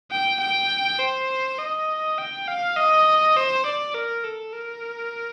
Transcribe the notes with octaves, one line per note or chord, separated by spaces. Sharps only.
G5
G5
C5
D#5
G5
F5
D#5
C5
D5
A#4
A4
A#4